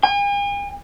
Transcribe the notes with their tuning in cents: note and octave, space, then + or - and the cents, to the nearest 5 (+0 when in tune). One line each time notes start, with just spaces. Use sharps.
G#5 -45